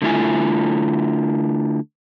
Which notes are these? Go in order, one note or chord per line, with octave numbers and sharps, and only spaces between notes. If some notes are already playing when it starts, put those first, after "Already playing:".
D3 A3 E4 F4 G#5